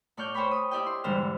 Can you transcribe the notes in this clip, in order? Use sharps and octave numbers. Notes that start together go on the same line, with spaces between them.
A2 D5 C#6 F6 G6
C5 C#5 G5 G#5 B5 C#6
D#6
E4 G4 D5 D#5 G5
C6
E2 G#2 D3 G3 C5 F6